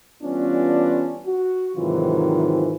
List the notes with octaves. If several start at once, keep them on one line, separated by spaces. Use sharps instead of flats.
E3 G3 B3 C#4 D4 F4
F#4
G#2 C3 D#3 E3 F#3 F4